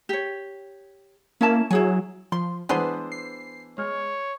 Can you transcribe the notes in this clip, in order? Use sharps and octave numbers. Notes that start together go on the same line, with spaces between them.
G4 C#5
A#3 C#4 E4 A5
F#3 E4 G#4 G#5
F3 C6
E3 B3 D4 G#4 B4 C5 C6
C7
G#3 C#5 F6